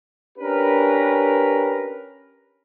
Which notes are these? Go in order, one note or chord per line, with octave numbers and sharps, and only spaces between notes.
C#4 D4 G4 A#4 B4